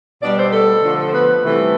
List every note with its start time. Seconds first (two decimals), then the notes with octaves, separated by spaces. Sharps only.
0.22 B2 G3 D4 D5
0.37 C4 C5
0.52 A3 A4
0.83 D3 F3 A3
1.09 C5
1.13 B3 B4
1.43 C3 E3 G3 A3 A4